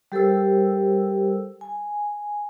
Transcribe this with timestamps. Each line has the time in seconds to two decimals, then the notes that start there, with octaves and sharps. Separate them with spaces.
0.12 G3 G4 A4 A#4 C5 E6
1.61 G#5